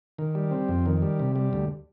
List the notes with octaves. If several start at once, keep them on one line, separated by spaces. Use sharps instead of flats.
D#3
G3
C4
F2
D#3
G3
C3
G3
D2